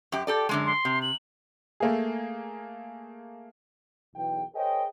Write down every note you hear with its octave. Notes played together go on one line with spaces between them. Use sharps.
F#2 G4
G4 A4 D5
F#2 D3 G#3
C6
C3
F#7
A3 A#3 G#4
B1 E2 G5
G#4 A#4 C5 C#5 D#5 G5